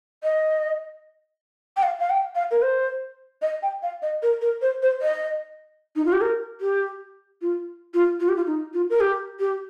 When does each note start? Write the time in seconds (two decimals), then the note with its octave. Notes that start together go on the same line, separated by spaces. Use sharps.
0.24 D#5
1.77 G5
1.83 F5
1.99 F5
2.10 G5
2.35 F5
2.51 A#4
2.62 C5
3.42 D#5
3.63 G5
3.83 F5
4.02 D#5
4.23 A#4
4.41 A#4
4.62 C5
4.82 C5
5.02 D#5
5.96 D#4
6.05 F4
6.13 G4
6.21 A#4
6.61 G4
7.42 F4
7.94 F4
8.20 F4
8.29 G4
8.36 F4
8.47 D#4
8.74 F4
8.90 A#4
9.01 G4
9.40 G4